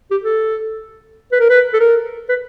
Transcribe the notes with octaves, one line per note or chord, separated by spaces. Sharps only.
G4
A4
B4
A#4
B4
A4
A#4
B4